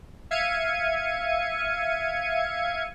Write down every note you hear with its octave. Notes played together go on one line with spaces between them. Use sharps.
E5 F5 G#6 C#7 D#7